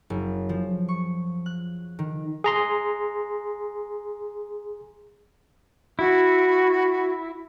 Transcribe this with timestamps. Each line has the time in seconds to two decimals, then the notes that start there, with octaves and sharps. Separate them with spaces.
0.10 F#1
0.49 F3
0.88 C#6
1.46 F#6
1.99 D#3
2.44 G#4 A#5 C6
5.99 E4 F#4